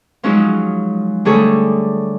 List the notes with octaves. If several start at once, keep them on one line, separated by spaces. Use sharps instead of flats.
F3 F#3 G#3 C#4 D#4 F#4
D3 G3 A3 G#4 A4 C#5